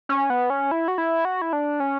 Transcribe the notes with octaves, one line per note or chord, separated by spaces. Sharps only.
C#4
B3
C#4
E4
F#4
E4
F#4
E4
D4
C#4